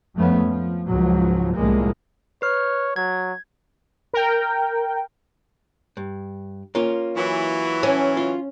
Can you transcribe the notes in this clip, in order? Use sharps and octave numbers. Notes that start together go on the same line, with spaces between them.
F2 G#2 F3 A3 B3 C#4
F3
C#2 G#2 F3 F#3
C2 A2 F3 G#3 A#3
B4 C#5 F6
F#3 G#6
A#4 G5
G2
A#3 C#4 F4
E3 F#3
C#4
F4